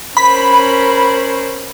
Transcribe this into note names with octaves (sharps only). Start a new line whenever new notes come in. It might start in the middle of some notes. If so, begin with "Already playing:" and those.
C#4 A#4 C5 B5